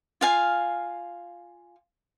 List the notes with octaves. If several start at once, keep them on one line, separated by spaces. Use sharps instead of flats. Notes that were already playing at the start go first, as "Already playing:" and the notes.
F4 F5 G#5